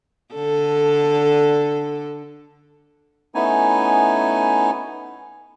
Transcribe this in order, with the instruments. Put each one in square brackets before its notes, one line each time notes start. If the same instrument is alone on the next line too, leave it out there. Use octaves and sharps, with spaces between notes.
[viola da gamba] D3 A4
[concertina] A3 B3 C#4 D#4 E4 G#5